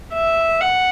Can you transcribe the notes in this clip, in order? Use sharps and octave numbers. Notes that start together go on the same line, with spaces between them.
E5
F#5